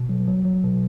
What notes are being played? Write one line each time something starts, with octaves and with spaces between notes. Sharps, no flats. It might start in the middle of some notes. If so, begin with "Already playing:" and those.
Already playing: B2
F#3
F#3
F#3
B2